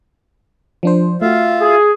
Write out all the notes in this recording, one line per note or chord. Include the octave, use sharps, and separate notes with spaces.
F3 D4 C5
A3 F4 F#4 E5 F5
G#4